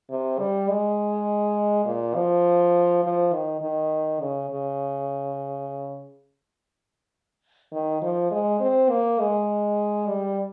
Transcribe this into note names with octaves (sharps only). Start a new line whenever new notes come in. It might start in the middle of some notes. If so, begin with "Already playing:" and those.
C3
G3
G#3
A#2
F3
F3
D#3
D#3
C#3
C#3
D#3
F3
G#3
C4
A#3
G#3
G3